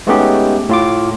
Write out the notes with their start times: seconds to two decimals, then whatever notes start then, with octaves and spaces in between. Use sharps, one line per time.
0.07 G#3 A3 B3 C#4 D#4 G4
0.69 A2 F4 D6